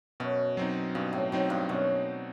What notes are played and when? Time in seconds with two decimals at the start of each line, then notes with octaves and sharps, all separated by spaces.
0.20 F#2 B2
0.57 F#3 C4 D#4
0.95 G2 B2
1.13 A2
1.32 A2 F#3 C4 D#4
1.50 G2
1.69 F#2 B2